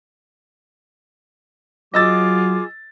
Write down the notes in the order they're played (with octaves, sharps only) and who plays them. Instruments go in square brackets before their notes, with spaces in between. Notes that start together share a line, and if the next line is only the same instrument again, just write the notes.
[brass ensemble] F#3 [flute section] F4 G#4 D6 [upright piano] D#5 E6 A6